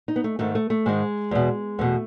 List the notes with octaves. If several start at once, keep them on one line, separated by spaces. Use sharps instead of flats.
D#4
B3
A3
G#2 D#3 A3
A3
A3
G#2 D#3 G#3
E2 B2
E2 B2 A3